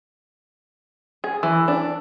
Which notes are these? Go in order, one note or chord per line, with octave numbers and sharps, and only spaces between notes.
G#4
E3
D4